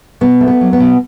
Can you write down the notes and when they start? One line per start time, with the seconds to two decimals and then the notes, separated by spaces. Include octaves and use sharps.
0.21 B2 B3
0.41 A3
0.48 B3
0.61 F#3
0.73 B3
0.80 B2